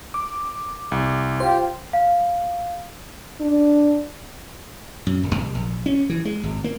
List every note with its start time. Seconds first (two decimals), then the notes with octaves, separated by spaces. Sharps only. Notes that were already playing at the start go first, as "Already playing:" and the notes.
0.14 D6
0.92 C2
1.40 F4 G4 C5
1.93 F5
3.41 D4
5.07 F#2
5.23 D#1
5.35 C2
5.55 A#1
5.86 C#4
6.10 E3
6.25 G#3
6.43 G#1
6.64 A#3